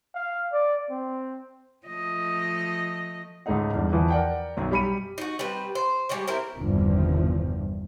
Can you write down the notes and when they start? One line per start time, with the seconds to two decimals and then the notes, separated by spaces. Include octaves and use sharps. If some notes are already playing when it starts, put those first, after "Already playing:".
0.15 F5
0.53 D5
0.90 C4
1.87 F3 A3 D#5
3.46 C#2 G#2 C#3 A3 D#4 F#5
3.74 E2 G2
3.92 E2 E3 F3
4.10 A#4 D5 F#5 G5
4.57 B1 F#2
4.71 G3 G4 B5 C#7 D#7
5.18 D#4 F#4
5.39 G3 C4 B4
5.75 C5
6.09 G3 G#3 G4 C#5
6.28 C4 E4 A#4
6.57 G1 E2 G2 C3 D#3 F3